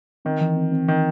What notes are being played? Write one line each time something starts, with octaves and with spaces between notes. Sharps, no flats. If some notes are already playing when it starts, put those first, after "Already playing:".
D#3 C4
E3
C4
C4
D#3 E3